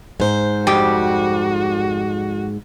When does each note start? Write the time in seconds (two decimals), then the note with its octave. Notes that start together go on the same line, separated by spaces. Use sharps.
0.20 G#2 C5
0.67 F2 G3 F#4 G4